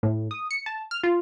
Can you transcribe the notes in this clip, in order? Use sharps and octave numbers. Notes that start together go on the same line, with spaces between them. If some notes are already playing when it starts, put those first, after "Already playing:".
A2
D#6
C#7
A5
F6
F4